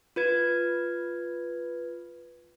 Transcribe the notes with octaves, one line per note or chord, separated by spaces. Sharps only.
F4 B4 G#6